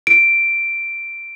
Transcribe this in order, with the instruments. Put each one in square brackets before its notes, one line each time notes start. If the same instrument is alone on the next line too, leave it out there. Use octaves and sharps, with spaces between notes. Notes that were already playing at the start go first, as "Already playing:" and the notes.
[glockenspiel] D7